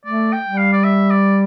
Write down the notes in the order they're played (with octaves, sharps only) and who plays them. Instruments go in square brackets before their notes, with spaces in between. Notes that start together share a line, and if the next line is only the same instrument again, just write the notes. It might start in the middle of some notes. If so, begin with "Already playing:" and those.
[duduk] A3 [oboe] D5
[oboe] G5
[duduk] G3
[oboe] F5
D5
E5
D5